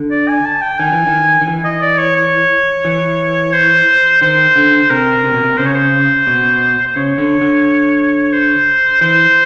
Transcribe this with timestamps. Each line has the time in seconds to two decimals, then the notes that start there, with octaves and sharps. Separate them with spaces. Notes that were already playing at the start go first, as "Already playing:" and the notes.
Already playing: D3
0.11 D5
0.28 G#5
0.45 A5
0.61 G5
0.79 D#3 G#5
0.92 E3
1.07 D#3
1.41 D#3
1.48 E3
1.64 D#5
1.81 D5
1.98 C#5
2.16 C#5
2.85 E3
3.53 C5
4.21 D#3 C5
4.56 D3
4.90 C3 A#4
5.24 C3
5.34 B2
5.44 C3
5.58 C#3 C5
5.66 C#5
5.74 C5
6.27 B2
6.87 C5
6.96 C#3 C#5
7.18 D3
7.41 D3
8.32 C5
9.01 E3 C5